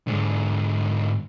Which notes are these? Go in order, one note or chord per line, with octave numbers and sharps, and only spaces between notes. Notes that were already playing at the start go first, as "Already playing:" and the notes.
G#2 D3